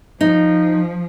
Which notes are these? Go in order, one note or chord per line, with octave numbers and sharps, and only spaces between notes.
F3 D#4